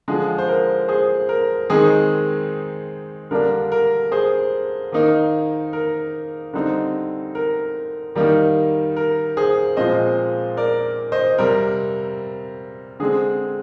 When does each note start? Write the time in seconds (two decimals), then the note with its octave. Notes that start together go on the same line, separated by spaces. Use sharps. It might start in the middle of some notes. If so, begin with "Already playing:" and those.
0.08 D3 F3 G#3 G#4
0.38 C5
0.48 A#4
0.88 G#4 C5
1.29 A#4
1.70 D#3 G#3 C4 D#4 G#4
3.31 D3 G3 A#3 D4 A#4
3.72 A#4
4.12 G#4 C5
4.92 D#3 A#3 D#4
5.73 A#4
6.53 D3 G3 C4 D#4
7.35 A#4
8.15 D#3 G3 A#3 D#4
8.96 A#4
9.37 G#4 C5
9.77 A#2 F3 G#3 C4 C5 D#5
10.57 A#4 D5
11.12 C5 D#5
11.38 C3 G3 C4 A#4
13.00 D3 G#3 C4 G#4